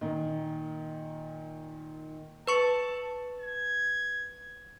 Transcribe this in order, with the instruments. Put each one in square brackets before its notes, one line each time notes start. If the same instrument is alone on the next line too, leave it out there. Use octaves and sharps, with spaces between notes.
[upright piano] A#2 D#3
[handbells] B4 C#6 C#7 [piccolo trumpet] A5
[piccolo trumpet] G#6